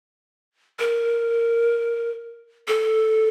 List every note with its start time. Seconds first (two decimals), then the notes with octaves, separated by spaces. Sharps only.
0.79 A#4
2.68 A4